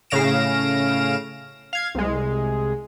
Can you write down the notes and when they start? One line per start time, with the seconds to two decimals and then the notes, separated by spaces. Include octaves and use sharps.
0.10 A2 C#3 F5 A#6 D7 E7
1.73 F5 G#6
1.95 C2 G#3